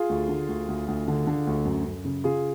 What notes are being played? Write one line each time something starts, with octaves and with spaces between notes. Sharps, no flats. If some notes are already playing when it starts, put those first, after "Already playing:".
Already playing: F4 G#4
D2
D3
D2
D2
D2
D3
D3
D2
F#2
F#2
C#3
C#3 F4 G#4